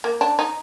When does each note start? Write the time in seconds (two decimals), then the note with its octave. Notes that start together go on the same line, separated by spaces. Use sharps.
0.04 A#3
0.21 D4
0.39 D#4